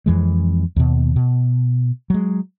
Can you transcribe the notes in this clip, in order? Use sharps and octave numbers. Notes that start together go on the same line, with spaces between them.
F2 E3 G#3
D#2 B2
B2
F#3 G#3